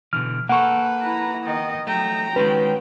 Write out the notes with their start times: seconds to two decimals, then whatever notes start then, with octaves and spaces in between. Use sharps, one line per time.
0.13 B2 D3 E3 F6
0.49 A#3 A4 B4 F#5 C#6
1.02 E4 A#5
1.45 D#3 D#5
1.87 F#3 A3 G5 A#5
2.36 D#3 G#3 C#4 F#4 B4